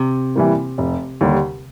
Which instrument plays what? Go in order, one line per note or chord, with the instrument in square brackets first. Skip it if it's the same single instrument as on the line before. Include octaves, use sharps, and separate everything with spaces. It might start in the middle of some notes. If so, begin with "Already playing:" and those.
Already playing: [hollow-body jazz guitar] C3
[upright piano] E3 G3 A#3
F1
D#2 D3 G3